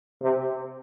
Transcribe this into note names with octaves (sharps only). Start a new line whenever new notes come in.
C3